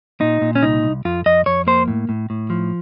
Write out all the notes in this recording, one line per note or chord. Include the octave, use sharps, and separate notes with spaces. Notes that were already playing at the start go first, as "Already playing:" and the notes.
A#2 D#4
A#2
C#4
C2 D#4
C2
F2 F4
F2 D#5
F2 C#5
A#3 C5
A2
A2
A2
F3